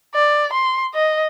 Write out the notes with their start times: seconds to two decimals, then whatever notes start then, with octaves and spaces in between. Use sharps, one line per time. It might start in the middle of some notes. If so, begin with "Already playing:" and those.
0.15 D5
0.53 C6
0.95 D#5